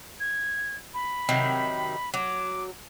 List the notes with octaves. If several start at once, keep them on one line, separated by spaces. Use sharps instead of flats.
G#6
B5
C3 D#3 F#3
F#3 D6